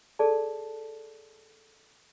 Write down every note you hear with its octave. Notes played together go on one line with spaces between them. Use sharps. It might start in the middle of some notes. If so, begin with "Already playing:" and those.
G#4 A4 D5 A5